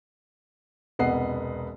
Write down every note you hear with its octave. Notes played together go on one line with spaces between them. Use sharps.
E1 C2 B3 D#5 F#5 C7